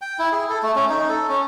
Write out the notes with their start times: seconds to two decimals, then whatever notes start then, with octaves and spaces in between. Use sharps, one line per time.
0.01 G5
0.19 E4
0.32 G#4
0.50 A4
0.63 A3
0.75 C#4
0.89 D#4
1.09 A4
1.29 C#4